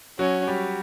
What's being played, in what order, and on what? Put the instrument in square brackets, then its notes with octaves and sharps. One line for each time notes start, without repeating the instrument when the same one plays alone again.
[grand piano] F#3 F#4 [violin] C#4
[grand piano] G3 G4